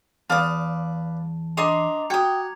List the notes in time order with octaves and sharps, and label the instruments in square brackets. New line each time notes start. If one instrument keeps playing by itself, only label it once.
[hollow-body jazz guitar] E2 [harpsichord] B4 D5 D6 [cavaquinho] F5 D#6 [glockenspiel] A5
[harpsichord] D4 [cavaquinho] D#5 C6 D#6 [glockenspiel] A#5 D6 F7
[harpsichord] F#4 [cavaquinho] G5 D#6 [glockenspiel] G#6 C#7